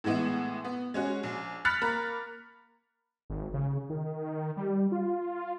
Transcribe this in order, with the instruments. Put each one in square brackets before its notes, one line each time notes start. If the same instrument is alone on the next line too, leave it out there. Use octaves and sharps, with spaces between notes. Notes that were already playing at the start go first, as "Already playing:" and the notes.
[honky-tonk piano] A2 E3 G#3 B3 E4
B3
G#3 C#4 F#4
A#1
B5 F6 F#6 A6 B6 C#7
A#3 A#5 B5
[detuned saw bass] G#1
C#3
D#3
G3
F4